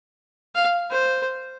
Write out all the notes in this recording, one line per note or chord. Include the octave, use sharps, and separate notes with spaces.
F5
C5